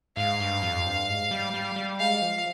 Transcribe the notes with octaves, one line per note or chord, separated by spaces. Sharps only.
G#2 F5
G2
F2
G2
G#2
G3
G3
G3
G#3 F5
F3